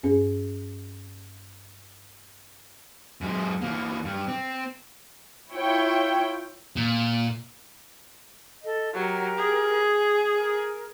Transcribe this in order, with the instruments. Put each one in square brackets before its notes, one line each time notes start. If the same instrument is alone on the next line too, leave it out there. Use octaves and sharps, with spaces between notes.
[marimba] G2 C#4 G#4
[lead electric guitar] F#2 G#3
E3 A#3
G2
C4
[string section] E4 F4 C#5 G5
[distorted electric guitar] A#2
[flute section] A4 D#5
[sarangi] F#3 [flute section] G4 A#4
[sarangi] G#4
[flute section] A#4